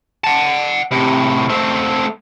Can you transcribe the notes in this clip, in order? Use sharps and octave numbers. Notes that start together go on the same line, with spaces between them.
F#5 A5
A2 C3
A3 C4